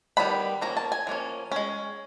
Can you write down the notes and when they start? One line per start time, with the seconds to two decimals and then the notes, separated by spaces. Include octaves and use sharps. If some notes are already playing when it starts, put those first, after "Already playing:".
0.17 D#3 G3 B3 D4 B5
0.62 F3 A#3 C#4 A#5
0.77 A5
0.92 G#5
1.07 F3 A#3 C#4
1.52 G#3 C#4